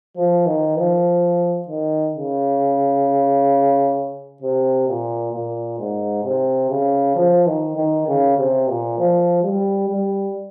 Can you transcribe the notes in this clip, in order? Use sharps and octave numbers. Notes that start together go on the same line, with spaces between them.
F3
D#3
F3
D#3
C#3
C3
A#2
A#2
G#2
C3
C#3
F3
D#3
D#3
C#3
C3
A#2
F3
G3
G3